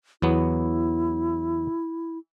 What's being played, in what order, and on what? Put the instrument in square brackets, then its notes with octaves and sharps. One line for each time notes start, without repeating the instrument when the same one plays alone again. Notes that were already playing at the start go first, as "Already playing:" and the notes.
[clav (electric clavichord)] E2 F#3 B3 [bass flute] E4